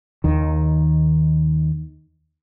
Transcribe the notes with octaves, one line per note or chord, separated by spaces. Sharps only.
D#2 D#3